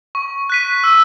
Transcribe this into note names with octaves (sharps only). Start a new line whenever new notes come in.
C#6
F#6 B6 D#7
E6